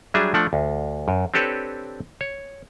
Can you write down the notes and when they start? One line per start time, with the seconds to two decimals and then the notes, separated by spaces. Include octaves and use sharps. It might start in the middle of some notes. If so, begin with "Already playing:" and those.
0.14 F#3 G3 D4 G#4 E5
0.34 F3 A3 D4 F#5
0.53 D2
1.08 F#2
1.34 C4 D4 G4 A4 B4 C#5
2.21 C#5